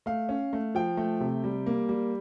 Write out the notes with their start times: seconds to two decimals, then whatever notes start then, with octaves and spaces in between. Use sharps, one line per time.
0.06 A3 F5
0.29 C#4
0.53 A3
0.75 F3 G5
0.97 A3
1.20 C3
1.44 G3
1.66 A#3
1.89 G3